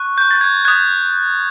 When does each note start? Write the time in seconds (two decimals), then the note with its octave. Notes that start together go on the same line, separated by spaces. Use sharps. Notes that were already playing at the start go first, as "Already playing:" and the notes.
Already playing: C#6 F#6
0.18 G6
0.31 A6
0.41 G#6
0.65 D#6 F#6 G#6